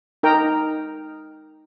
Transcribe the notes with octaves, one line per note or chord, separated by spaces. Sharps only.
D#4 A#4 G5 A#5